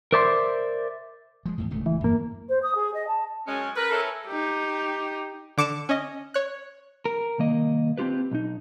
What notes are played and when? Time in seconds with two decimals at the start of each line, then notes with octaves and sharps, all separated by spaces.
0.13 A#4 C5 D5 E5 B5 C6
1.46 F3 G#3
1.58 E2 A2
1.70 D1 C#2 A3
1.86 E3
2.04 F#2 A#3
2.49 C5
2.63 D#6
2.75 G#4
2.94 D#5
3.07 A5
3.47 F#2 G#3 C#4
3.76 A#4 B4
3.90 C#4 E4 A4
4.27 D#4 G4
5.58 D3 D6 C#7 E7
5.89 C#4 D#5
6.34 C#5 F#6
7.06 A#4
7.38 C2 D#3 A#3 D#5
7.98 C4 D#4 F4 G4 B4
8.31 B1 D#4